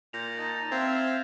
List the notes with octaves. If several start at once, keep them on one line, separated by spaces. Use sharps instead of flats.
A#2 G6 A#6 F7
D#4 D#5 A5 A6
C4 E5 F5 G#6